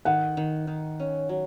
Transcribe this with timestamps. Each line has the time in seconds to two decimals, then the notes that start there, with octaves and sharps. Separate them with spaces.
0.05 D#3 F#5
0.37 D#3
0.67 D#3
0.99 C#4
1.29 F#3